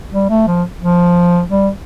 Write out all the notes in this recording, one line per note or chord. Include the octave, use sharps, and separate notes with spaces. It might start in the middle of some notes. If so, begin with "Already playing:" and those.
G3
A3
F3
F3
G3